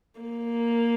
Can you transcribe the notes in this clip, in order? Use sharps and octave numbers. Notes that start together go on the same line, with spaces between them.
A#3